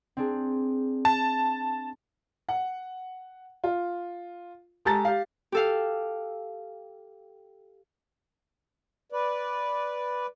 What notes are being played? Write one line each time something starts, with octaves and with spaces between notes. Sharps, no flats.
C4 D4 G#4
A5
F#5
F4
G#3 G4 A4 A5 A#5 A6
G4 F5
G4 A4 F5
B4 D5